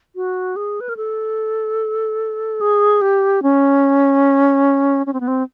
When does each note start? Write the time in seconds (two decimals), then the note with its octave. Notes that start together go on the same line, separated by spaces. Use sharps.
0.16 F#4
0.56 G#4
0.80 B4
0.89 A#4
0.97 A4
2.61 G#4
3.01 G4
3.43 C#4
5.06 C#4
5.13 C4
5.20 B3
5.27 C4